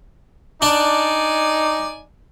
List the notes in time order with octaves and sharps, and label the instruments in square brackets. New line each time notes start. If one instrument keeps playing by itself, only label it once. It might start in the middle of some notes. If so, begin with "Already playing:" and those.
[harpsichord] D4 [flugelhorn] D#4 [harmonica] D5 G#5